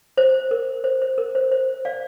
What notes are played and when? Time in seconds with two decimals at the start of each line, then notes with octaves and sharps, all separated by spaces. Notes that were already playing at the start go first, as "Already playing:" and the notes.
0.17 C5
0.51 A#4
0.84 C5
1.02 C5
1.18 A#4
1.35 C5
1.52 C5
1.85 D5 F5